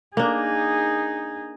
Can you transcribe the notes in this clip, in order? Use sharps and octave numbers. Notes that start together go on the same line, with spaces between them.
A#3 D4 D#4 G#4